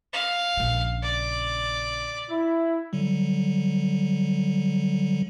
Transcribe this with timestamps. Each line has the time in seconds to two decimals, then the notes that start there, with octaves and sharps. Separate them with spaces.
0.13 F5
0.57 A#1 C#3
1.03 D5
2.30 E4
2.93 D3 F#3 G3